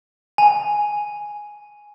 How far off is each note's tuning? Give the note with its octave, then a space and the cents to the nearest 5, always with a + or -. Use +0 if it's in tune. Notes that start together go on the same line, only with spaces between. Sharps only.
G#5 +0